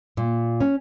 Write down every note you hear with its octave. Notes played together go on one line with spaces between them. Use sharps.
A#2
C#4